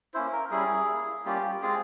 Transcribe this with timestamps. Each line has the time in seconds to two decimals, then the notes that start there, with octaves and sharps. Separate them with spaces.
0.14 A#3 C#4 E4 C5
0.32 A#4
0.51 G3 C#4 E4 G#4
0.88 A#3 E4
1.25 G3 A#3 C#4 F4 G4
1.62 G#3 C4 F4 G#4